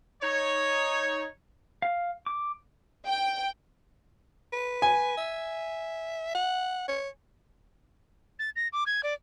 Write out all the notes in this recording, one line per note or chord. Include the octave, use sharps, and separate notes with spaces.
D#4 C#5
F5
D6
G5
B4
G#5
E5
F#5
C#5
A6
A#6
D6
G#6
D5